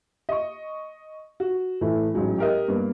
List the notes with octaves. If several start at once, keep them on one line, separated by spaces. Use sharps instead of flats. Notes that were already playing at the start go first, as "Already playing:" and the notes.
D#5 C#6
F#4
A2 E3 A3
A1 G#2 F#3 G#3
G4 A#4 D#5
G2 A#3 B3